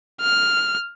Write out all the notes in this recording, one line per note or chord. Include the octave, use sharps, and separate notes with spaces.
F6